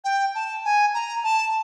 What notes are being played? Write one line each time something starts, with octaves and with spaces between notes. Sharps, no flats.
G5
A5
G#5
A#5
A5